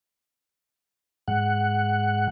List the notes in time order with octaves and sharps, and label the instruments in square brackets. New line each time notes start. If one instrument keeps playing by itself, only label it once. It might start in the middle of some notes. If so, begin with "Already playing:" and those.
[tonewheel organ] G#2 F#5